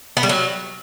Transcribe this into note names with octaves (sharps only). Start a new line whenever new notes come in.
B3
G3
F#3